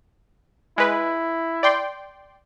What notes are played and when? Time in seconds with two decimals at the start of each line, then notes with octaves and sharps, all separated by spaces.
0.78 G#3 E4 B4
1.63 D5 G5 C6